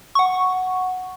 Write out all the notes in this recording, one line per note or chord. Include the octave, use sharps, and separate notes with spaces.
F#5 C#6